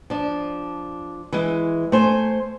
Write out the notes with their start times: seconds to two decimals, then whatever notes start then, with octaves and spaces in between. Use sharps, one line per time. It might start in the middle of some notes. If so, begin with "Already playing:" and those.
0.10 F3 D4
1.33 E3 G#3
1.92 A3 C5 G#5